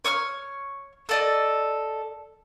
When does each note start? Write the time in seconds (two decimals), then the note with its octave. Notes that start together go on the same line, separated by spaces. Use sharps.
0.05 C#5 C#6 D#6 F6
1.09 A4 D5 D#5